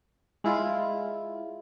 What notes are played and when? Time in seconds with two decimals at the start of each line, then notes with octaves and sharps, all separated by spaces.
0.44 G#3 E4 F4